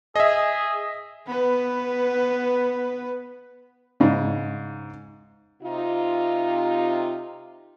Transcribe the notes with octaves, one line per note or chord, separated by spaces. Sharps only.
G#4 D#5 E5
B3 B4
G#2 C#3
C3 D#4 F4